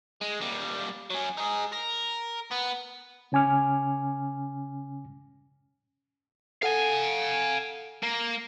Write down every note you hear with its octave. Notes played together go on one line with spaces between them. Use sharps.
G#3
A#2 G3
F#3 C#4
D#4 G#4
A#4
B3
C#3 C#4 G#5 D6 F6
A4 F5 F#5 G#5
A#3